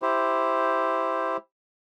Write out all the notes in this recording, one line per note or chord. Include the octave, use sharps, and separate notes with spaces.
E4 G4 C5